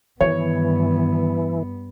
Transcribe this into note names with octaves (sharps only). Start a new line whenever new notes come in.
G2 D#3 E3 B3 C#5